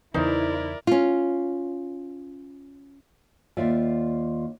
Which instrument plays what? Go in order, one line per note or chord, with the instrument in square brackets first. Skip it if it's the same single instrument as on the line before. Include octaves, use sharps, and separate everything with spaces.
[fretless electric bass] E2 C#3 E3 [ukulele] D#4 C5 [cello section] E4 [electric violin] A#4 D5
[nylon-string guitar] C#4 F4
D#2 F4 D5 E5